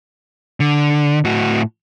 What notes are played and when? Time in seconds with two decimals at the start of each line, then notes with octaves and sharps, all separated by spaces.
0.60 D3
1.25 A2 F#4